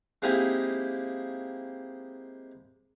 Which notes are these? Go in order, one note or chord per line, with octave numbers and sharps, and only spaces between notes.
G#3 A#3 C4 D#4 E4 G4